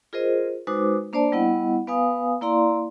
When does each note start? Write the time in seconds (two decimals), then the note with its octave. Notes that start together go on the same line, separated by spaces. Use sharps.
0.13 F4 G#4 A#4 C5 D#5
0.67 G#3 D#4 F#4 B4 C5 D6
1.13 A#3 D4 C5 D5 A5
1.32 G3 B3 E4 D#5 F#5
1.87 B3 B4 F5 G#5 D#6
2.41 A#3 E4 D5 F5 A#5 C6